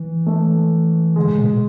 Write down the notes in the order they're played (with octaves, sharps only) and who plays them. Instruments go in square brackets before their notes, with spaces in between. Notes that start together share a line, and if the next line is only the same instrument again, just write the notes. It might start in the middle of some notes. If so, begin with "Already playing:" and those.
Already playing: [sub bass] E3
[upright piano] A3
[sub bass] D3 [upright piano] G#3
[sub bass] A2
B2
B2